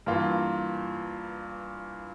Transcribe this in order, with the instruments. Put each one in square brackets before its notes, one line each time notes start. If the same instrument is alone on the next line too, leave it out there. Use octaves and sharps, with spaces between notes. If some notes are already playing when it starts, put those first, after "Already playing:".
[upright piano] G2 E3 A#3 F4